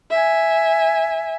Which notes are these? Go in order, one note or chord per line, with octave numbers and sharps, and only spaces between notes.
E5 G#5